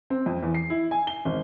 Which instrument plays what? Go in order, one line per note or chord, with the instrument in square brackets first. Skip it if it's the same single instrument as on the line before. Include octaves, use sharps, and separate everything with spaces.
[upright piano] C4
F2
E2
C7
E4
G#5
G7
G#1